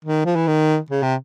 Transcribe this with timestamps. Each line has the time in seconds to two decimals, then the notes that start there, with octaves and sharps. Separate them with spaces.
0.05 D#3
0.25 F3
0.36 E3
0.48 D#3
0.91 C#3
1.03 C3